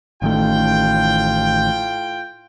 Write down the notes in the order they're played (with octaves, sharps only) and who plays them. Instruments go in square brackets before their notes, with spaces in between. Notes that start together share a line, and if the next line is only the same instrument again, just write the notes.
[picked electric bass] A1 D#3 A3 [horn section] A2 F4 G5